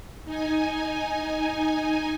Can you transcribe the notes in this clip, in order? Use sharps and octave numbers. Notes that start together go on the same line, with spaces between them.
D#4 G#5